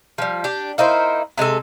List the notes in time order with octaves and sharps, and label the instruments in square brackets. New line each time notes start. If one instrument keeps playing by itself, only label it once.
[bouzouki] F3 G3
D4 G4
A#3 D#4 E4 C5
C3 G#3 G4 A4